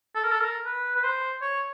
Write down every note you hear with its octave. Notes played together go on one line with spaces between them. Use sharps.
A4
A#4
A4
A#4
B4
B4
C5
C#5